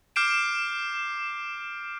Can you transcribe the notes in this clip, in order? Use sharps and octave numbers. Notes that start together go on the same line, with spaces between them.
D6 F6 G6 C7 D7 E7